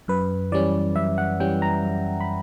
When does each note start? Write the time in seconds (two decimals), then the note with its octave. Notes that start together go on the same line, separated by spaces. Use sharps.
0.08 F#2 B4
0.52 E3 G3 C#4 D5
0.96 F#2 E5
1.18 F#5
1.40 E3 G3 C#4 G5
1.62 A#5
1.83 F#2
2.21 B5